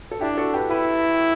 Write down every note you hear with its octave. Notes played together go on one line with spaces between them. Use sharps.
A4
D4 E4 G4
F#4 A4
G4 B4
E4 G4 B4